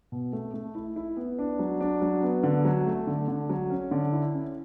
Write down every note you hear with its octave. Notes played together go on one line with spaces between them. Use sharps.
B2
A3
A3
E4
E4
B3
D4
F#3
D4
F#3
B3
D3
F#3
A3
D3
D3
F#3
C#4
D3
E4
C#4